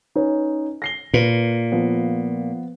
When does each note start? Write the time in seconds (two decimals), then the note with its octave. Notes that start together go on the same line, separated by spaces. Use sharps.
0.15 C#4 D#4 B4
0.82 A#6 C7 G7
1.14 A#2 B4
1.72 F3 B3